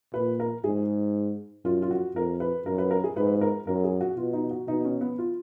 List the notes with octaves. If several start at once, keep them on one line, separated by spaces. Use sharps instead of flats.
A#2 B4
A#4
G#2 G#4
F#2 F4
F4
F#4
F2 A#4
B4
F#2 A#4
B4
A#4
G#4
G#2 B4
B4
A#4
F#2 A#4
G#4
F#4
B2 F4
D#4
F#4
B2 D#4
C#4
B3
F4